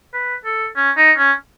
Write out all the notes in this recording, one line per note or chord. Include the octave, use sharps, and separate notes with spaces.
B4
A4
C#4
D#4
C#4